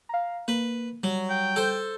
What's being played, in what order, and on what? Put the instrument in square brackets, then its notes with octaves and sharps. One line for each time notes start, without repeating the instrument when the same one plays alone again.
[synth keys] F5 A#5
[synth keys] A#3 [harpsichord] B4
[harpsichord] F#3 [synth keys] G3
[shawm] G5
[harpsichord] A4 C5